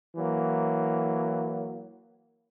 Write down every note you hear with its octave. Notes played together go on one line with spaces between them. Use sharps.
E3 F#3 A#3